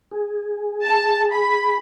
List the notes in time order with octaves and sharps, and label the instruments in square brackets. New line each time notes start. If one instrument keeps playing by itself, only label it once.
[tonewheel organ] G#4
[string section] A5
B5